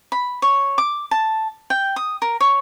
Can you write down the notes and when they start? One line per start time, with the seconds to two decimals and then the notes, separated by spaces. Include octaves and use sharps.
0.12 B5
0.42 C#5
0.78 D6
1.11 A5
1.70 G5
1.96 D#6
2.22 A#4
2.41 C#5